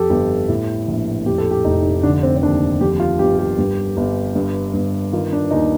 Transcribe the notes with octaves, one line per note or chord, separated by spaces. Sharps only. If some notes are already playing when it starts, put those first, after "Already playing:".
Already playing: F2 G4 A4
G1 G4
A2
A#1
F2 G4
A4
G4
F1 D#4
D3 D4
C4
C4
D#2 D4
F2 G4
F4
G1 G4
G4
G2
G1
G2
G1
D#3 F4
D4
D#2 D#4